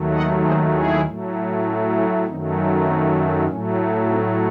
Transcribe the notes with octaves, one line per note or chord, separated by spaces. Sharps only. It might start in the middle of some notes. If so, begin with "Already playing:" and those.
Already playing: D#2 D#3 F#3 A3
D#5 F#5
G#4 C5
E4 G#4
A2 F#3 A3
C#4 E4
C#4 E4
F#2 D#3 F#3 A3 C4 D#4
C#4
C4 D#4
C#4
A2 F#3 A3 C#4
C4 D#4